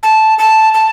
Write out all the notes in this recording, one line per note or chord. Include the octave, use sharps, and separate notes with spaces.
A5
A5
A5